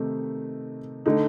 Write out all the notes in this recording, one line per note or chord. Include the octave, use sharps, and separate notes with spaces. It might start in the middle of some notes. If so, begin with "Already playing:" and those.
Already playing: C3 D#3 A3 D#4
D3 A3 D#4